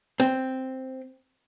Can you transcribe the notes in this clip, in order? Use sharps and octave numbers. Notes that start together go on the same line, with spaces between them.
C4